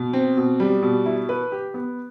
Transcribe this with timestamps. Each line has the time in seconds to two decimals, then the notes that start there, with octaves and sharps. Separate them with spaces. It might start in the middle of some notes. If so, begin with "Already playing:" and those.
Already playing: B2
0.13 C4
0.37 B2
0.60 G3
0.83 B2
1.06 E4
1.29 B4
1.52 G4
1.74 B3